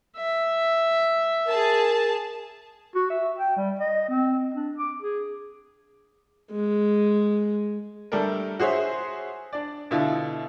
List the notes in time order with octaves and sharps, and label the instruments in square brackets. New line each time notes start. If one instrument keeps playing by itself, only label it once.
[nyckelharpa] E5
[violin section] G#4 A5 [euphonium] A#4
[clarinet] F#4
E5
G5
G3
D#5
C4
D4
D6
G#4
[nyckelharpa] G#3
[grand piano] G3 A3 D4 A4 A#4
F#4 G#4 C5 C#5 E5
D4 D5
B2 D3 E4 F4